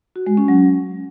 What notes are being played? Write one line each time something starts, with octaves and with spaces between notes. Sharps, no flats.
F#4
G#3
C#4
F#3